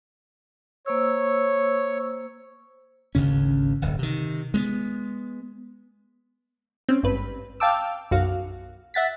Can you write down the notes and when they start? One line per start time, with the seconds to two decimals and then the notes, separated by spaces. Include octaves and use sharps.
0.86 A#3 C5 C#5 E6
3.15 G#1 D2 C#3 C#4
3.82 D1 G1
3.99 C3 D#3
4.54 G#3 A#3 B3
6.89 C4 C#4
7.03 G#1 G2 B4
7.60 F5 G5 A5 D6 E6
8.11 B1 F#2 F#4 F5
8.94 E5 F#5 A6 B6